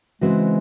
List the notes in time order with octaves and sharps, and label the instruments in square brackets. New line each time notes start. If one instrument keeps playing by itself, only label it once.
[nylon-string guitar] C#3 E3 C4 F#4 C5 [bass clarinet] G#3